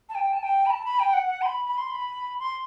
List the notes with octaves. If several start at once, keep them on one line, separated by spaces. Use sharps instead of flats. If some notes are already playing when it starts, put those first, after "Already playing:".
A5
G5
A5
G5
B5
A5
B5
G5
F#5
F#5
C6
B5
B5
C6
B5
C6